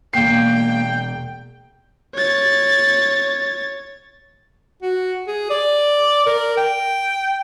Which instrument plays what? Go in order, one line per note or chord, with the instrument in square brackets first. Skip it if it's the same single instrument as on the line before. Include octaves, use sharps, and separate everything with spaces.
[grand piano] E1 C7 [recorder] A#3 [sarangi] G5
[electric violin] C#5 A6
[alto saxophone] F#4
G#4
D5
A#4
G5